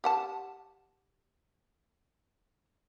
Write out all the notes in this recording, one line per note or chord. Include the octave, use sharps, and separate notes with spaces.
G4 F#5 A5